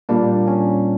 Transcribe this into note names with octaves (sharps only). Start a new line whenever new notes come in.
A#2 G3 A#3 D4
C#4